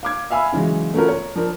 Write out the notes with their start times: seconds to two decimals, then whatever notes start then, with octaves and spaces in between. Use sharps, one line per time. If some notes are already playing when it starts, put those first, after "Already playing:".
0.03 F5 D6 G#6
0.30 E5 F5 G#5 B5 E6
0.52 C#3 E3 F#3 G#3
0.94 A3 B3 C#4 F4 F#4 A#4
1.08 C#5
1.35 F3 D4 A#4